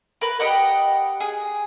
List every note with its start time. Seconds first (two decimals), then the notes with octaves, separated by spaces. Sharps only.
0.21 A#4 B4
0.40 G4 D#5 F#5
1.20 G#4